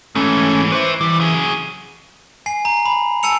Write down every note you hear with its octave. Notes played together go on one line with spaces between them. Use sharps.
G#2 E3 A3 C#4
B4 C5 E5 C#6 D6
E3 G3
F#3 G#4
G#5 C7
A#5
B5
G#5 A5 E6 C#7 F7